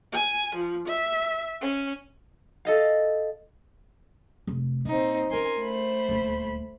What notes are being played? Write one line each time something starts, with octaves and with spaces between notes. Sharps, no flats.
G#5
F3
E5
C#4
A4 D#5 F5
F1 C3
A#2 C4 D#4
C#4 F4 A#4 G#5 C6
A3 C5 B5
D#1 D2